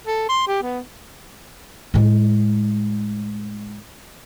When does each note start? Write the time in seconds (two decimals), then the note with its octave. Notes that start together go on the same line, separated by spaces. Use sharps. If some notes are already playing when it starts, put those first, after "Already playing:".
0.07 A4
0.29 C6
0.48 G4
0.63 B3
1.94 A2 G#3